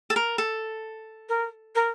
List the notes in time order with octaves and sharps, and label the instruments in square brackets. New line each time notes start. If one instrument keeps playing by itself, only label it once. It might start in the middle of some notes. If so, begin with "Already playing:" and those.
[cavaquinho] A4
A#4
A4
[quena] A#4
A#4